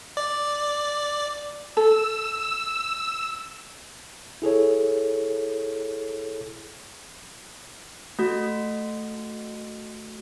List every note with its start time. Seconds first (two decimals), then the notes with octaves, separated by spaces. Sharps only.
0.17 D5
1.77 A4 E6
4.42 E4 G#4 A4 C#5
8.19 A3 F#4